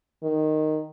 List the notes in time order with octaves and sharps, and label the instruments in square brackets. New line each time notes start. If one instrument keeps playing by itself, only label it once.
[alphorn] D#3